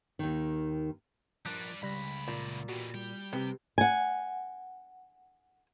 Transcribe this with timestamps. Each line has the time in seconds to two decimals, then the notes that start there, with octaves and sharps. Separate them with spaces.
0.19 D#2 D#3
1.45 F3 G3 D4 A#4 A5 D6 F#6
1.83 C#2 F#2 G3 B5 F#6 A#6
2.28 A#2
2.69 B2 E3 F#4 G4
2.95 G3 G5
3.33 C3 G4 B4
3.78 F#5 G#5